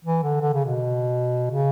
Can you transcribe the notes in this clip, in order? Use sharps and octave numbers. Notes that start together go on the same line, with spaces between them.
E3
D3
D3
C#3
B2
C#3